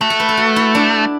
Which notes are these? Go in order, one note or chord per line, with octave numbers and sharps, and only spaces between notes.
A3 F#4
A4
B4
A4
F#4
E4
D4